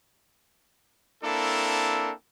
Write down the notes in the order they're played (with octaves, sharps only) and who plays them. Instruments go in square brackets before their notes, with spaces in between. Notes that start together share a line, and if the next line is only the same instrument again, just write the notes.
[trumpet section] A#3 C4 D4 E4 A4